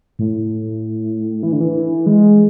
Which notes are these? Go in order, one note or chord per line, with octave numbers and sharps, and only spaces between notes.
A2
E3
D3
E3
G#3